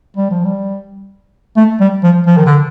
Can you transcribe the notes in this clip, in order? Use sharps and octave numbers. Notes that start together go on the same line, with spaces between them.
G3
F3
G3
A3
G3
F3
F3
D#3
D3